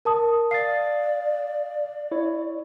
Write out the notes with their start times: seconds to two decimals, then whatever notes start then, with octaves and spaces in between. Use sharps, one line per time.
0.05 A#4 A5 D#6
0.51 D5 F5 D#6 A6 C7
2.12 E4 C#5